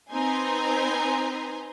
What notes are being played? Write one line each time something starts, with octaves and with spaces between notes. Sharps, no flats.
C4 D#4 B4 G#5 A#5 C6